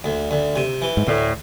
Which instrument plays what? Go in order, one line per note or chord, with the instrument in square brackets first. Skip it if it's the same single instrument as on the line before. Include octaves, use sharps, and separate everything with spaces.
[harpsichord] D2
D2
C3
E3
[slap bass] G#2
[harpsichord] D2 [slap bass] A2